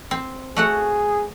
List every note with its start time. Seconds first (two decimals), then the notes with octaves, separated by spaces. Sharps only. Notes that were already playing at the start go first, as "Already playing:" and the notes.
0.11 C4
0.56 A3 F#4 G#4 F#5